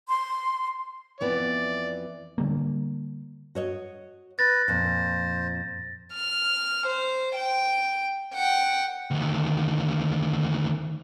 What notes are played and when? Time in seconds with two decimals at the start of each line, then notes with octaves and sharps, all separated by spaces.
0.08 C6
1.21 F2 E3 B3 D5
2.38 D3 G3 A#3
3.55 F#4 C#5 D#5
4.39 B4 A6 A#6
4.68 F2 A#2 C5
6.14 F6
6.86 C5
7.35 G5
8.34 F#5 G5
9.11 D2 D#3